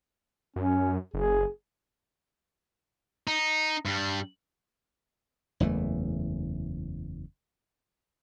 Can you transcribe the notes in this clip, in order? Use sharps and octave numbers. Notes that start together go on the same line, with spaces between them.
F#2 C#4
F#1 G#4
D#4
G2 G3
F#1 E2 E3 A3